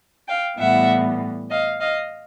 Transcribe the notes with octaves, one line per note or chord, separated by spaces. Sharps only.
F5 G5
A2 E3 G3 B3 E5 F#5
D#5 F5
D#5 F5